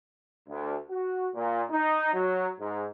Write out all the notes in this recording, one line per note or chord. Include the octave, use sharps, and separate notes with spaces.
D2
F#4
A#2
D#4
F#3
G#2